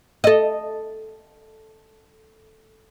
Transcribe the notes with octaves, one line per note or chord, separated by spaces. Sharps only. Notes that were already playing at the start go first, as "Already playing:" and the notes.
A4 D#5